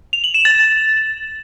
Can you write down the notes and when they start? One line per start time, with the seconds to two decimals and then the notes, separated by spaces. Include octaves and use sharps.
0.13 F7
0.24 F#7
0.34 E7
0.45 A6